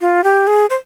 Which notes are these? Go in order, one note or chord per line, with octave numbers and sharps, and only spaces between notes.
F4
G4
G#4
C5